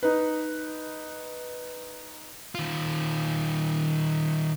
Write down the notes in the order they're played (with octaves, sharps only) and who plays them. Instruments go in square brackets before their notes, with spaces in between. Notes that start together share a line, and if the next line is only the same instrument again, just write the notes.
[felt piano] D#4 B4
[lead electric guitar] D#3 F4